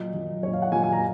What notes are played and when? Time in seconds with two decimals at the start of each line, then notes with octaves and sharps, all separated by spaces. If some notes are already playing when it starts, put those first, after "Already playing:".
Already playing: A#2 F#3 D#5
0.14 A#2 F#3
0.43 F#3 C#5
0.47 A#2
0.53 F5
0.62 F#5
0.72 A#2 F#3 G#5
0.83 G#5
0.93 A#5